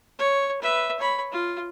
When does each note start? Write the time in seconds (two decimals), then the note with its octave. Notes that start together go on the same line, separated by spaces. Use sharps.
0.19 C#5
0.61 B4 E5
0.99 C#5 B5
1.32 F4